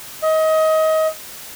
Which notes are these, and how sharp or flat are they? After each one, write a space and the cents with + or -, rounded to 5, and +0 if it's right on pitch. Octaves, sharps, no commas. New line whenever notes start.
D#5 +25